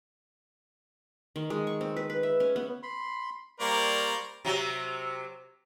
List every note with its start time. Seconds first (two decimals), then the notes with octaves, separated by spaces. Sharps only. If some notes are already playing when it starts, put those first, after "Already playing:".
1.36 D#3
1.50 G#3
1.67 C#6
1.81 C4
1.96 B4
2.10 B4
2.23 E5
2.40 C#4
2.56 B3
2.83 B5 C6
3.60 G3 A#3 A#4 C5 D5 C#6
4.45 C3 F#3